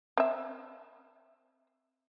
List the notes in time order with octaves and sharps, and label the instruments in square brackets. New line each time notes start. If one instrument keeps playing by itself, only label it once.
[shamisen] C4 E5